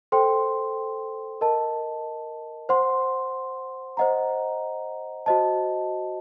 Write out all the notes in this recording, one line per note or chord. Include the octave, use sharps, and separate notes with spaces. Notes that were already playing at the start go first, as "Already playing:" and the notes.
A4 C5 G5 C6
A#4 D#5 A5
C5 F#5 C6
C5 D#5 F#5 A#5
F#4 C5 D#5 A5